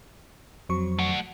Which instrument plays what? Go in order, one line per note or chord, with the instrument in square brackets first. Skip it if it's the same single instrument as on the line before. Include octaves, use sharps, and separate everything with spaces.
[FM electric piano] F2 F#3 C#6
[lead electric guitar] A3 F#5